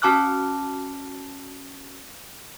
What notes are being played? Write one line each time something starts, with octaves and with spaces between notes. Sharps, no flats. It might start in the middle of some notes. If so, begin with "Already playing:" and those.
C#4 F#4 A5 D6 F6 F#6